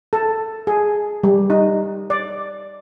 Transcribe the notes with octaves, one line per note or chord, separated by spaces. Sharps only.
A4
G#4
G3
D#4
D5